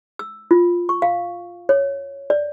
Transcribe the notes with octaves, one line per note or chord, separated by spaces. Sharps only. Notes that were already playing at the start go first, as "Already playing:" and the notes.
E6
F4
C#6
F5
C#5
D5